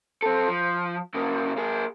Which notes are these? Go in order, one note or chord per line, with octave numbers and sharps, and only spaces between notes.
C4 A4
F3
C#3 A#3
A#3 G#4